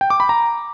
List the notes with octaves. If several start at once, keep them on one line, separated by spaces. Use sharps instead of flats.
G5
D6
B5
A#5